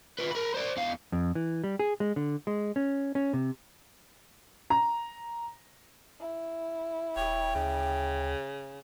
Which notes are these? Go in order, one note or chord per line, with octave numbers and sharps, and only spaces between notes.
F4 B4
A#4 B5
C5 D5
E2 F5
F2
E3
G3
G#4
G#3
D3
G#3
C#4
C#4
C3
A#5
E4
D#1 C#5 G5
D2 C#3